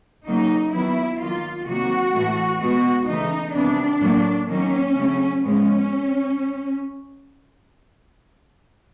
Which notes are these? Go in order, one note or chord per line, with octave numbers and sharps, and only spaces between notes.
C#3 F#3 A#3 D#4
D#3 F#3 B3 E4
D#3 F#3 A#3 F4
C3 D#3 F#3 A#3 F#4
A2 E3 A3
B2 G#3 B3 F#4
C#3 E3 A3 D#4
C3 D#3 G3 B3 D4
A2 F#3 A#3
D#3 F#3 A#3 C#4
C#3 F#3 A3
A2 F3 G#3 B3 C#4